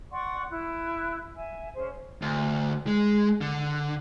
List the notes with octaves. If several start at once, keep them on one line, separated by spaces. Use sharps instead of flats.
D5 F#5 C6 C#6
E4 F#6
E5 G#5
C#4 G#4 C5
D2
G#3
D3